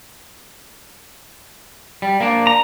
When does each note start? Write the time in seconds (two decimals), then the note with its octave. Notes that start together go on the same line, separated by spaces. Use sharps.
2.02 G3
2.21 A#3 D4
2.47 A#5